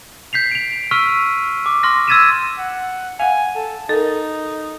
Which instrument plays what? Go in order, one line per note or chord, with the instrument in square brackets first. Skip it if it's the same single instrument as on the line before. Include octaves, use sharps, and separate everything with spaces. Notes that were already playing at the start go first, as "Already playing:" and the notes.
[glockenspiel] G6 B6 C7 F7
D7 F7
C#6 E6 F6 B6 D#7 F7
D6
C6 F6 A#6
E6 G#6 A6 B6 D#7 E7
[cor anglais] F#5
[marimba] F5 F#5 [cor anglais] G#5
[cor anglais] A4
[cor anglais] D#4 [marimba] A4 A#4